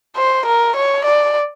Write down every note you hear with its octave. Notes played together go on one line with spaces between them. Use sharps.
C5
A#4
C#5
D5